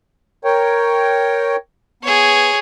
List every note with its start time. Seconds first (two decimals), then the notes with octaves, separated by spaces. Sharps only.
0.44 A#4 C#5 G5
2.03 B3 G#4 C#5